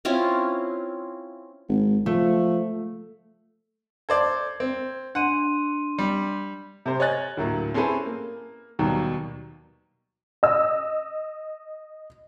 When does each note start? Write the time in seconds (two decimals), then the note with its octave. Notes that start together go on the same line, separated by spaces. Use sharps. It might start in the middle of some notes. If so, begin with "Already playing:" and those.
0.05 C4 C#4 E4 F4
1.69 G#1
2.06 F3 A3
4.09 A4 C5 D5 G#6
4.60 C4
5.15 D4 F#5 C6 D#7
5.98 G3
6.86 C3 G4 C5
7.00 C#5 D#5 G#5 F#6 A6
7.37 D2 A2 F#3 A#3
7.74 C4 C#4 E4 G#4 A4 B4
8.06 A#3
8.79 D#2 B2 D#3 F#3 G3
10.43 D#5 E6